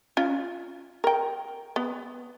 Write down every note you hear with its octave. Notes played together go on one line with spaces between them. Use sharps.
C#4 F4
A#4 G5
B3